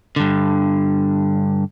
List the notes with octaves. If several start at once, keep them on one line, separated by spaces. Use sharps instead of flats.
G2 D3